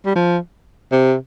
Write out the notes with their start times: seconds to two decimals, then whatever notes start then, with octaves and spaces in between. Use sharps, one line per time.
0.05 G3
0.15 F3
0.92 C3